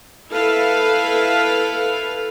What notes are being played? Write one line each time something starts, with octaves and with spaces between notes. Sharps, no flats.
E4 A4 B4 F5